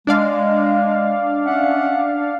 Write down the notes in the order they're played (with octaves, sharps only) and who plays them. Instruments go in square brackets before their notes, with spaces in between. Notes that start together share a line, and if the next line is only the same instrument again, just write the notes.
[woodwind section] G#3 [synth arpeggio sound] D4 D5 F5
[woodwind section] C#4 E5 F#5